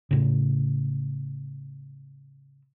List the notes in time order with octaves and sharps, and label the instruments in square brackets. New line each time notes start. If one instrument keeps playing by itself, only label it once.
[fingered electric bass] A2 C#3